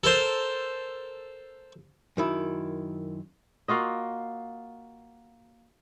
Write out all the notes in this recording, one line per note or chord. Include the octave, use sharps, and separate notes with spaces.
A4 A#4 C5
F#2 D#3 E4
A#3 F4 F#4 D#5